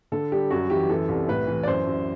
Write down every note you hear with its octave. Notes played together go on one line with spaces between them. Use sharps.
D3 A4
G3 G4
F#2 F#4
E3 G4
E3 A4
C2
A2 B4
E3
D5
F#2 C5
F#2